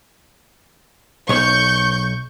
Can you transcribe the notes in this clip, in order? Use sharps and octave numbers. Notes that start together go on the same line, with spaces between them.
B1 C#5 C#6 G6